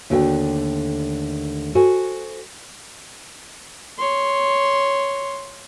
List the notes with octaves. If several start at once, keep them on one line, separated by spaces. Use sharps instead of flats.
D#2 D3 A3 F#4 D5 G5
F#4 A4 C5 G#5
C#5 C6